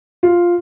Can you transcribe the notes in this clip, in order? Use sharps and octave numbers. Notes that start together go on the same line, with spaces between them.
F4